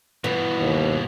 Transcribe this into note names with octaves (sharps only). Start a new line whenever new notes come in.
G2 B2 E3
D#2